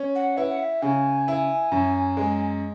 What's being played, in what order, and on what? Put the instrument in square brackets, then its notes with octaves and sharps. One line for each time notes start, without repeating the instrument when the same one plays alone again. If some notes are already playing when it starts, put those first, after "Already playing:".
Already playing: [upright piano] C#4
[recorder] F#5
[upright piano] E4 [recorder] B4
[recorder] F#5
E5
[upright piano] C#3 [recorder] G#5
[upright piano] E4
F#2
G#3